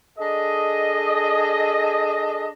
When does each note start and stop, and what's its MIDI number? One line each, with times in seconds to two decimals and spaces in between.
0.19 2.48 62
0.19 2.48 68
0.19 2.48 69
0.19 2.48 75